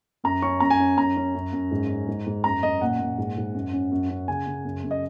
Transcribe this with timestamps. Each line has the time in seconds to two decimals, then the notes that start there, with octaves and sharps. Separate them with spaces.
0.24 F#2 A#5
0.42 C#4 C#6
0.60 F#2 A#5
0.70 G#5
0.79 C#4
0.98 F#2 A#5
1.16 C#4
1.35 F#2
1.53 F#2
1.71 G#2
1.89 C#4
2.08 G#2
2.26 G#2
2.44 F#2 A#5
2.63 F#2 D#5
2.81 A#2 F#5
2.99 A#2
3.18 G#2
3.37 G#2
3.54 F#2
3.73 C#4
3.91 F#2
4.10 C#4
4.28 C#3 G#5
4.47 C#3
4.65 F#2
4.84 F#2
4.91 D#5